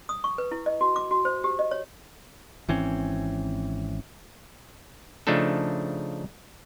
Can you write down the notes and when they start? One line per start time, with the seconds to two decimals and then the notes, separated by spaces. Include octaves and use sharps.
0.09 D#6
0.24 C#6
0.38 B4
0.52 E4
0.66 D#5
0.81 F#4
0.96 D6
1.11 F#4
1.25 C5
1.44 G4
1.59 D#5
1.71 C#5
2.69 G#1 E3 C4 C#4
5.27 C#3 F3 A3 D4 D#4 A4